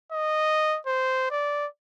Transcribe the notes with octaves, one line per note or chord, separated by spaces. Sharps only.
D#5
C5
D5